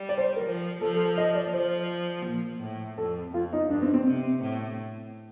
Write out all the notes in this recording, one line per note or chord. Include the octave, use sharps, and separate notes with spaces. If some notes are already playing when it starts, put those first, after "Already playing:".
Already playing: G3
D5
C5
A#4
F3
F3 A4
A4
A4
D#5
D5
F3 C5
A#2
A2
F2 A4
F2 F4
D#4
G2 D4
C4
C4
C3 C4
A2